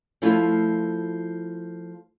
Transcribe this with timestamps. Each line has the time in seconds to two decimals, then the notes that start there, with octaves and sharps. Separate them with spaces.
0.22 F3 A3 E4 F4